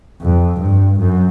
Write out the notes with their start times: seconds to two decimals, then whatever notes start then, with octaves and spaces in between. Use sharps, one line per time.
0.22 F2
0.61 G2
0.99 F#2